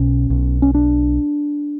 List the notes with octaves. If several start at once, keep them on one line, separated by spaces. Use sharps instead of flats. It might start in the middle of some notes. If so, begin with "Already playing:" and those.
Already playing: B1 B2 C#4
B1
C#4
D4